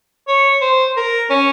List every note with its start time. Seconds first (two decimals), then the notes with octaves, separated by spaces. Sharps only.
0.28 C#5
0.61 C5
0.97 A#4
1.30 C#4